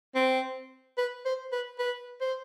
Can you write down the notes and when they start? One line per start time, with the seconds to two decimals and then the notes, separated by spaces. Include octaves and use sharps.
0.15 C4
0.98 B4
1.25 C5
1.52 B4
1.79 B4
2.21 C5